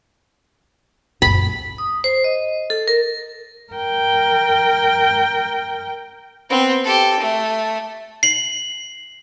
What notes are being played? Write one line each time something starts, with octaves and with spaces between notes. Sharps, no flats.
F#2 A#2 B5
D#6
C5
D#5
A4
A#4
A#4 G5
B3 C4
G4 A4
A3
C7 F#7